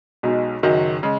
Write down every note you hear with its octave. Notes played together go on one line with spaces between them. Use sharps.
B1 B2 G#3 D#4
F#1 F#2 D#3 F#3
C#3 G#3